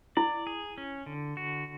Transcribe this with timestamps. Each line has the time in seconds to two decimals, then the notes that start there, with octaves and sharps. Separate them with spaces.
0.17 E4 D5
0.47 G#4
0.78 C#4
1.06 D3
1.37 F#4